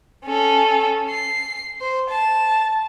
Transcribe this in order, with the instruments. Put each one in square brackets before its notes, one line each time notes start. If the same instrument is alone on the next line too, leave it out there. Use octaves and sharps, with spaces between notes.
[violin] C#4 A4
C7
C5
A5